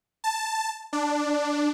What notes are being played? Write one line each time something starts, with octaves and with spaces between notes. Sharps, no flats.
A5
D4